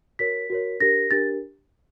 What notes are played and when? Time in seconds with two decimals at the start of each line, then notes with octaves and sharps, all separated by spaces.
0.19 F#4 A#4 C#5 B6
0.50 F#4 A#4 C#5
0.80 D4 G4 A#4 A#6
1.11 D4 G4 A#4 A6